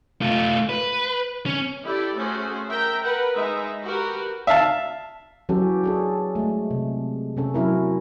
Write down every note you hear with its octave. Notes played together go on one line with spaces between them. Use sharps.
A3 F4
B4
C#4
E4 G4 A4 D5
A3 C#4 F#4 G#4 C5
A#4 E5 G5 A#5
A#4 B4 F#5
G#3 D#4 E5
F#4 G4 A#4 B4
E5 F5 A5
E3 F#3 C#4 G4 A4
D4 G#4 A4
G#3 A3
C3
C3 C#4 A4
F#3 C#4 E4 A#4